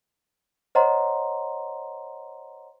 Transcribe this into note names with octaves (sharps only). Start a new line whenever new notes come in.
C5 C#5 D#5 F#5 A#5 C6